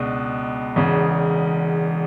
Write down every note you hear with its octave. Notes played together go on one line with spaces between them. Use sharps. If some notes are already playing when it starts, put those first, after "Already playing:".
Already playing: C#2 B2 G#3 D4
E1 E2 C#3